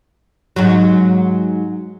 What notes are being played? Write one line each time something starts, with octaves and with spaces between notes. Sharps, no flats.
G#2 F#3